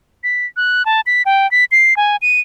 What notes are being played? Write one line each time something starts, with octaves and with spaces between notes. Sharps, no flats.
B6
F#6
A5
B6
G5
B6
C7
G#5
D#7